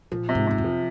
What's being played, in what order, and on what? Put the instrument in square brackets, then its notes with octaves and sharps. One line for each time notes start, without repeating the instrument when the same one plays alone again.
[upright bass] A#2 [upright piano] F3
[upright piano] C3
[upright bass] G#2
[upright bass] F#2 [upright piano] C3
[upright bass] F2
[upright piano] F3